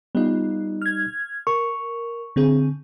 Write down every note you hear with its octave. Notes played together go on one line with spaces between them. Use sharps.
G3 B3 D#4 F4
F6 G#6
A#4 C#6
D3 C4 G#4